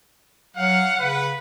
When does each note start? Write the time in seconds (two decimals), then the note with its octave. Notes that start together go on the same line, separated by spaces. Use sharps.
0.57 F#3 F5 F#5
0.99 C#3 B4